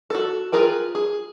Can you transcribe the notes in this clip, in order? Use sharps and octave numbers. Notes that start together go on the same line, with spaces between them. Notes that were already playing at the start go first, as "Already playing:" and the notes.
F#4 A4
F4 G#4 A#4 B4 G5
G#4